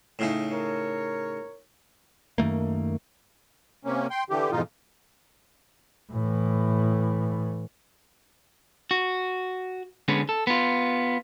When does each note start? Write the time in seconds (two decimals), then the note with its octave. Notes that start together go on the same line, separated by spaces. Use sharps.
0.19 A2 C#3 D#4
0.52 A#4 C#5
2.38 F#2 D#3 A3 A#3
3.85 C3 A#3 C#4
4.10 G5 C6
4.30 D3 E3 G4
4.51 F2 G#2 B2 E3 D#4 F4
6.12 A2 E3
8.91 F#4
10.08 D3 G#3 B3 C#4
10.29 A4
10.47 B3 F4